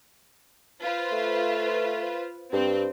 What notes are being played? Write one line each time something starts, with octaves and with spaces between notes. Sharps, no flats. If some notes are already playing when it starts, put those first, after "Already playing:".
F4 B4 C5
A3
G2 C4